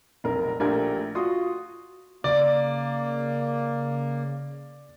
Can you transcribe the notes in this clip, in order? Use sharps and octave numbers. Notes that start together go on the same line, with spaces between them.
F1 B1 A#4
A#1 A3 G4 A#4 G#6
F4 F#4 C6 C#6 D#6
C#3 A#3 D5